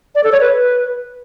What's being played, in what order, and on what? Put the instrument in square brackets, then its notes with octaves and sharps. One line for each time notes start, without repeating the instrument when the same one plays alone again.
[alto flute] D5
A4
C#5
B4